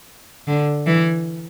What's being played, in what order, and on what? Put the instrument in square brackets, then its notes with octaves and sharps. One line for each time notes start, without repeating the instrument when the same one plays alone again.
[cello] D3
E3